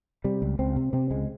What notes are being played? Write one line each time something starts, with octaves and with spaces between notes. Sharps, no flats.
C3 G3
C#2
C#2 C4
C3
C3 C4
C#2 G#3